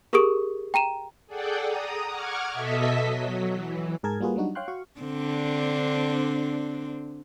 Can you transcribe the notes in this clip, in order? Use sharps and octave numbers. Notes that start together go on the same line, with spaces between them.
G4 G#4 A#4 C#6 D#6 D7
G5 A#5 D#7 E7
G#4 A4 D5 F#5 G5
A#5 D#6
F#5 C#6 D6 F6 G#6
B2 A4 D#5 E5 B6
F#3
E3
G#2 G#4 A#4 A5 G#6
G3 A#3 F4 F#4 G#4 B4
F#3 G3 D4 D#4 F#4
C#5 F5 G5 C6 F#6
F#4 F5 C#6
D3 C4 D4